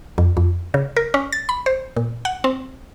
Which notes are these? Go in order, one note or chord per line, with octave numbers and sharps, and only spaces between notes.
F2
F2
C#3
A#4
C#4
A6
B5
C5
A#2
F#5
C4